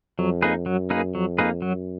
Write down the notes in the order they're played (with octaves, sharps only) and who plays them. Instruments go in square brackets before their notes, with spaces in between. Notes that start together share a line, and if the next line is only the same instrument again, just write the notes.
[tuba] F2 [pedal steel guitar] F#3
[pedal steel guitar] A#3 D#4 G#4 B4
[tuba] F#2 [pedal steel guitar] F#3
[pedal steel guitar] A#3 D#4 G#4 B4
[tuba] F2 [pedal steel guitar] F#3
[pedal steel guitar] A#3 D#4 G#4 B4
[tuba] F#2 [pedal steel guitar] F#3